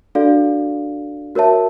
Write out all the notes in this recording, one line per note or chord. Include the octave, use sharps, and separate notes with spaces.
D4 F#4 A4 D5 F5
F#4 A#4 C#5 E5 A5